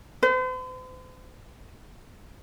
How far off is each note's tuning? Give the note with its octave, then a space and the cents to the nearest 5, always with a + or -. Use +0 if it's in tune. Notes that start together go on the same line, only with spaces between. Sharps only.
C5 -45